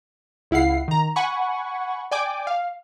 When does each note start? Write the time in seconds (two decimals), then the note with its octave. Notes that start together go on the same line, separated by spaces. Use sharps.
0.51 C#2 E4 F5 F#5 C7
0.88 D#3 A#5
1.16 F#5 G#5 B5 C#6
2.11 D5 G5 G#5 D6
2.47 F5